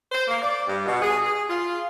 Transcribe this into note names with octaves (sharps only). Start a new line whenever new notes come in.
C5
A#3
D5
G2
B2
G#4
G#4
F4